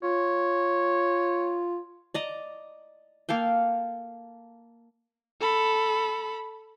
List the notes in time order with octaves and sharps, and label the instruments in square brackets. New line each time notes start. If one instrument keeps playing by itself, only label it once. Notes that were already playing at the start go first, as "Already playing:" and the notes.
[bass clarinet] F4 [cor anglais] C#5
[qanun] D5 D#5 A#5
A#3 A4 F5 G5
[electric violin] A4 B5